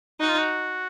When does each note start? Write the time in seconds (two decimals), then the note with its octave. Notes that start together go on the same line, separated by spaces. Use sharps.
0.20 D#4 F#4
0.29 F4
0.38 F#4